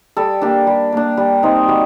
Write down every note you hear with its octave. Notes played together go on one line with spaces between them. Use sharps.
G3 A4
A#3 D4 G4
G3
A#3 D4
G3
C4 D#4
G3 F#4